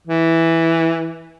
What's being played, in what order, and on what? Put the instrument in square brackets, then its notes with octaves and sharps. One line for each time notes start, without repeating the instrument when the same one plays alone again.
[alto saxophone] E3